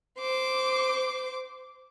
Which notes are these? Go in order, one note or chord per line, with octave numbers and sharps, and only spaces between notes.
C5 D6